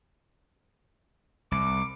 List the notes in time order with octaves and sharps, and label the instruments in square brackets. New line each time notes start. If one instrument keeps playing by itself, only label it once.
[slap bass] C2 [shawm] D6